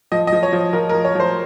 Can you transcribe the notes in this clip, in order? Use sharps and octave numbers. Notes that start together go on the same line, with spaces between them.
F3 D#5
D#5
F3
C#5
F3
F3 A#4
A#4
F3
C#5
F3 C5